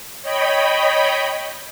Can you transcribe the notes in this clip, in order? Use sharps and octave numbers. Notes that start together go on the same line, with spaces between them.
C#5 D#5 G5 B5